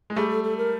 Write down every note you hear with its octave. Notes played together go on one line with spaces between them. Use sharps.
G#3
G3 A3 G#4
A4
A4
A#4